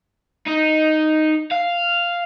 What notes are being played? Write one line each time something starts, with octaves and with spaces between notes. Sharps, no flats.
D#4
F5